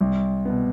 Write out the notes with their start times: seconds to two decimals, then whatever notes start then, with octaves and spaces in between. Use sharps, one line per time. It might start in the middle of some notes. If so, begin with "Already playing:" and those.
0.01 C2
0.45 B2 B3